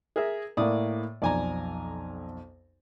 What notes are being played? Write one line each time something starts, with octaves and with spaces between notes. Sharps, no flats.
G#4 A#4 E5
A2 A#3 D5 D#6
B1 F2 D5 G#5 A#5